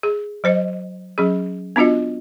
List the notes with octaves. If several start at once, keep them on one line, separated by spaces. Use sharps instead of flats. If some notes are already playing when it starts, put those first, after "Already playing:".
G#4
F#3 C5 D#5
F#3 C#4 G#4
B3 D4 F4 F#4 D#5